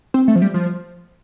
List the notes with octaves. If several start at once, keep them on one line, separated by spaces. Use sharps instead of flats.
C4
A3
F3
G3
F3